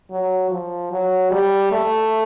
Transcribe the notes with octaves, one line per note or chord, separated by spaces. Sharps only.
F#3
F3
F#3
G3
A3